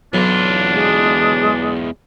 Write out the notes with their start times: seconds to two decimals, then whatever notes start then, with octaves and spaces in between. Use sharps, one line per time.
0.13 B1 E2 F#3 D4 F4
0.72 G#3